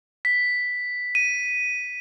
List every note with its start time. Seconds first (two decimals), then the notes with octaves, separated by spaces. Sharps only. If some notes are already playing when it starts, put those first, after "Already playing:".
0.25 B6
1.15 D#7